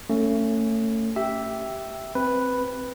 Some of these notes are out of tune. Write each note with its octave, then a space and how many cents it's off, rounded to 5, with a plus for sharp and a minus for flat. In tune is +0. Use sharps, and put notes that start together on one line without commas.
A3 +30 C#4 +0
G4 -15 E5 +0 G5 +0
C4 +0 B4 +0